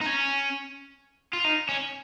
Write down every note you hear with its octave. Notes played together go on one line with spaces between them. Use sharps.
D#4
C#4
F4
D#4
C#4